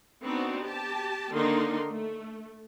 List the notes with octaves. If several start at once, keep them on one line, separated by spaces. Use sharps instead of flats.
B3 C4 D4 D#4 F#4
G4 A5
D3 D#3 A#3 D4 D#4 C6
A3